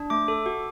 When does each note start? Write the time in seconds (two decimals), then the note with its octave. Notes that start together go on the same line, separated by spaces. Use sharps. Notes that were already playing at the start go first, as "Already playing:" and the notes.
Already playing: D4
0.10 A3 D6
0.28 A4
0.46 F#4